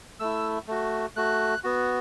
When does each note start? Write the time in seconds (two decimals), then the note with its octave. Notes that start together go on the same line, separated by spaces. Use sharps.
0.20 A3 E4 E6
0.68 A3 F#4
1.16 A3 F#4 F#6
1.64 B3 F#4